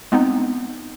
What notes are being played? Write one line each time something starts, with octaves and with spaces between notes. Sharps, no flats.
G#3 B3 C4 D#4